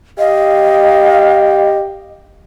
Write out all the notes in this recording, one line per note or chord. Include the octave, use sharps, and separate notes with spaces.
G4 D#5 F5